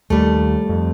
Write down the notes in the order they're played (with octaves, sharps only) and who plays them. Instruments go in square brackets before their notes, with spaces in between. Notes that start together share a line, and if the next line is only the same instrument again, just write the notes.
[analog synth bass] D#2 [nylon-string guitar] G3 A3
[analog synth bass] F2